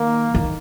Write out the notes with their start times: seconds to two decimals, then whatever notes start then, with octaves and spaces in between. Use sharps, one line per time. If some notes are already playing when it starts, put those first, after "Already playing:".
Already playing: D#3 A#3
0.35 D#3